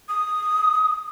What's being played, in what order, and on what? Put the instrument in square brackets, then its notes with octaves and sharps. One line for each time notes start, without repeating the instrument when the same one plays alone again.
[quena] D#6